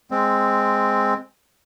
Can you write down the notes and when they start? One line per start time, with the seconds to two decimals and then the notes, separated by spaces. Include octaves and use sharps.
0.11 G#3 C4